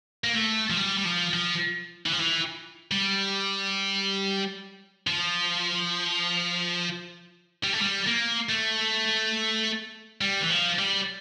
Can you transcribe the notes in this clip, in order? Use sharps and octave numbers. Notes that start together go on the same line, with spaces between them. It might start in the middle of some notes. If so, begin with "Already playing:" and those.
A#3
A3
F3
G3
G3
F3
F3
E3
F3
E3
G3
F3
G3
A3
G3
A#3
A3
G3
E3
F3
G3